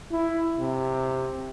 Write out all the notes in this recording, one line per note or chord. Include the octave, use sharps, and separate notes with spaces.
E4
C3